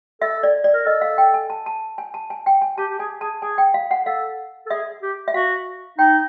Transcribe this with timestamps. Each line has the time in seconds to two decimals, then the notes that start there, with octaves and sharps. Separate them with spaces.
0.22 A4 E5
0.43 D5
0.64 D5
0.74 A#4
0.86 A4 D#5
1.02 F5
1.18 G5
1.34 G#5
1.50 A5
1.66 A5
1.98 G#5
2.14 A5
2.30 G#5
2.46 G5
2.62 G#5
2.78 G4 A5
2.91 G4
2.99 G#4 G#5
3.21 G#4 A5
3.42 G#4 G#5
3.58 G5
3.74 F5
3.91 F#5
4.06 A4 F5
4.66 A4
4.70 G#4 E5
5.02 G4
5.28 E5
5.34 F#4 F5
5.98 D#4 G5